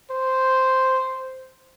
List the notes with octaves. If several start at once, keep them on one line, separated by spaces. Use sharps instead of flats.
C5